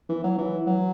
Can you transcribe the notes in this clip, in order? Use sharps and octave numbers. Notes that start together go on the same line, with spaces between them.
E3
F#3
E3
F#3